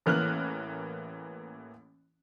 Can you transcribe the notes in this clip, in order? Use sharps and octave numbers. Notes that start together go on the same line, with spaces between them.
A1 E3 A#3 F6 F#6 F#7